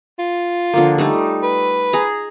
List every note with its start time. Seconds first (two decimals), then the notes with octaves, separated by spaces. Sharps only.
0.19 F4
0.74 D3 F3 A#3
0.98 G3 A3 D#4
1.43 B4
1.93 G#4 A#5